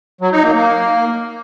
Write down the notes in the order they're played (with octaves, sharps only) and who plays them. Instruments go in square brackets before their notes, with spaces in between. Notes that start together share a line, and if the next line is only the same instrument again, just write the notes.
[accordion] F#3
D#4
A#3
A#3